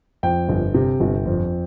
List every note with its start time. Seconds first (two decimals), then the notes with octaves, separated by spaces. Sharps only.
0.23 F2 G5
0.49 G1
0.74 C3
1.00 G1
1.26 F2